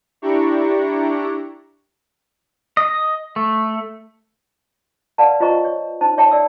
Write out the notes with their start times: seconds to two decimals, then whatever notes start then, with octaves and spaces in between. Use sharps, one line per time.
0.22 D4 E4 G4 A#5 C#6
2.77 D#5
3.36 A3
5.18 B4 D5 F5 F#5 A5
5.40 F4 C5 D#5 A#5 C#6
5.65 C#5
6.01 D#4 C5 A5
6.18 C#5 E5 G5 A5
6.32 D5 E6